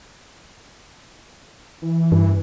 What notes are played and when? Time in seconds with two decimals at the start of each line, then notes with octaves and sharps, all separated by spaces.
1.82 E3
2.12 G2